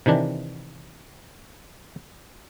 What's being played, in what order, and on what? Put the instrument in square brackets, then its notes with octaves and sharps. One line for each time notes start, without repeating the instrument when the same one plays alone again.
[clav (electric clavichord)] C3 D#3 E3 D4